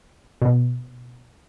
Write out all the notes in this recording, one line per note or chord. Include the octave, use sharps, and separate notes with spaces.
B2